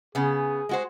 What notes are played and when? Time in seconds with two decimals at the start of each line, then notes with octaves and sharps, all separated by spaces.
0.15 C#3 B3 G#4
0.69 G#3 F#4 C5